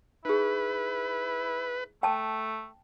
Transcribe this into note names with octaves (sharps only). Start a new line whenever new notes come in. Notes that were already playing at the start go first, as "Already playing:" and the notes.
D#4 E4 G#4 B4
A3 G5 A5